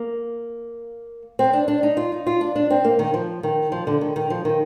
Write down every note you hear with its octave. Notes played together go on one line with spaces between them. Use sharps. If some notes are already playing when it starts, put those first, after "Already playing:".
Already playing: A#3
C4
D4
D4
D#4
F4
D#4
F4
D4
D4
C4
A#3
D#3
F3
D#3
F3
D3
D#3
D#3
F3
D#3